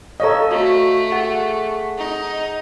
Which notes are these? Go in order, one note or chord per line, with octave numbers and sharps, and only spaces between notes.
A4 C#5 D#5 F5 A#5
A3 F#4
G#4 F#5
D#4